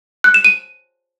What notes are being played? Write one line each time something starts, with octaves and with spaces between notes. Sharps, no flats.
F#6
E7
D#7